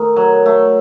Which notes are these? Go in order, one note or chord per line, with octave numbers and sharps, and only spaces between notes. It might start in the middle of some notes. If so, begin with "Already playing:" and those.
Already playing: D#3 A3
F#3
A3